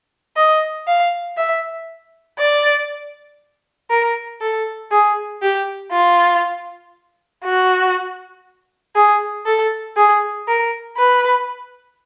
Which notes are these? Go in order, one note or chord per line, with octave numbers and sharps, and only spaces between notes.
D#5
F5
E5
D5
A#4
A4
G#4
G4
F4
F#4
G#4
A4
G#4
A#4
B4